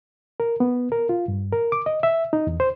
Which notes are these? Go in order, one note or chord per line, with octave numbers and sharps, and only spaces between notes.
A#4
B3
A#4
F4
G2
A#4
D6
D#5
E5
D#4
E2
C5